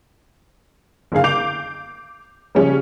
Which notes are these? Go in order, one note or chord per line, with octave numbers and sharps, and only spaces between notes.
F#1 D3 G#4 F5
D6 G6 C7 F7
C#3 F3 G3 C#4